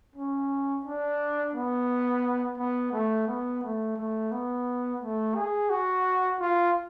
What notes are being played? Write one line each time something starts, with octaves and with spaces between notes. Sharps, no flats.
C#4
D4
B3
B3
A3
B3
A3
A3
B3
A3
G#4
F#4
F4